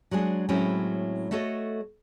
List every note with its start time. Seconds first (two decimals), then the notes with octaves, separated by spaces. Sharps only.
0.11 F#3 G#3 D4 G#4
0.49 A2 F#3 G#3 C4 C#4 E4
1.31 A3 F#4 A4 C#5 D#5